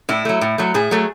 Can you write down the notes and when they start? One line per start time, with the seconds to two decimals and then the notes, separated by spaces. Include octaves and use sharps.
0.09 A2 E4
0.25 F#3 A3
0.41 A2
0.58 F#3 A3
0.74 A2 G#4
0.91 F#3 A3